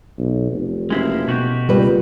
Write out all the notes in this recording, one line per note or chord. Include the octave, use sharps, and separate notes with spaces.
B1
F1
F#1 G#3 E4 F4
B2 F#4 G4
C#2 A#2 G3 B4